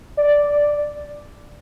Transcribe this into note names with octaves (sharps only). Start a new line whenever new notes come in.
D5